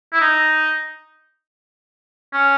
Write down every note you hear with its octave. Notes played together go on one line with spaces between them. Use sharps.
E4
D#4
C#4